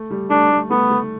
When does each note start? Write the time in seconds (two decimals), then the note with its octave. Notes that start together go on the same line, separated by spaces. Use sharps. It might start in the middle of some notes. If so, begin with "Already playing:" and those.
Already playing: A3
0.10 G3
0.30 A3 D4
0.50 A3
0.71 A3 B3
0.90 A3